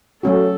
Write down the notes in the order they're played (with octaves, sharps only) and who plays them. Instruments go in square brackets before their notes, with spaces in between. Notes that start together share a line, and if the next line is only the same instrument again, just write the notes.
[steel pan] F#3 A3 C#4 F#4 [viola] A4